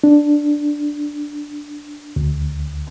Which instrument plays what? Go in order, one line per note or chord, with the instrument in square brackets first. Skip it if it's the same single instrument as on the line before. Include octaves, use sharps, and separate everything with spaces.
[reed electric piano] D4
D2